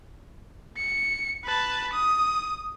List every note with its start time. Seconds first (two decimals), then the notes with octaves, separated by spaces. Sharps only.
0.77 C#7
1.45 B4 A5
1.93 D#6